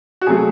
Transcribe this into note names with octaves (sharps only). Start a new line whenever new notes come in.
F#4
C3 F#3 A3 G#4